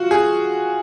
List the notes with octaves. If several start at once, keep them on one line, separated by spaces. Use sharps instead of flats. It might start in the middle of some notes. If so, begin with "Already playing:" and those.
Already playing: F4 F#4
G#4